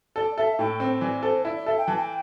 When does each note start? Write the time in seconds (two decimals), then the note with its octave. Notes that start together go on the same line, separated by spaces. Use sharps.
0.16 A4 D5
0.37 A4 E5
0.59 A2 G5
0.80 C4
1.01 E3 D5
1.23 A4 C5
1.45 E4 D5
1.55 D5
1.66 A4 E5
1.77 G5
1.87 E3 A5
1.96 G5